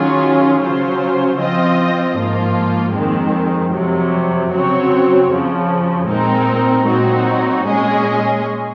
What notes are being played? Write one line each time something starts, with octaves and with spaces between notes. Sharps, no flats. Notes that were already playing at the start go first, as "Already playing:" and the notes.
Already playing: D#3 F#3 C#4 F4 G#4
C#3 F#3 C#4 F4 C5
F3 C4 F4 C5 D#5
G#2 F3 A#3 F4
F2 D#3 G#3 C4
F2 C3 F#3
C#3 F#3 C4 F#4 C#5
F2 C#3 F3
A#2 G#3 C4 D#4 A#4
A#2 F#3 C4 D#4 F#4
A#2 G#3 C#4 G#4 D#5